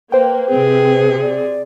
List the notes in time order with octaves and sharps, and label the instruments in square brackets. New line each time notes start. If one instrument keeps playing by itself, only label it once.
[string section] A#3 [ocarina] B4 [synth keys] C5 G5
[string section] C3 C4 [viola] G#4
[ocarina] D5